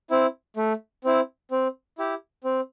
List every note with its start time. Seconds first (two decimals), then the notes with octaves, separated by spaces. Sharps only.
0.10 C4 E4
0.56 A3
1.04 C4 E4
1.51 C4
1.98 E4 G4
2.44 C4